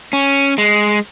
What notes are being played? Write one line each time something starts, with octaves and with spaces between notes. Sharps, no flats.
C#4
G#3